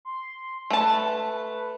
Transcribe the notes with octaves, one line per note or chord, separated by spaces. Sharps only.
C6
A3 B4 A5